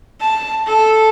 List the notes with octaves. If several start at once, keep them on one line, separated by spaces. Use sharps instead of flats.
A5
A4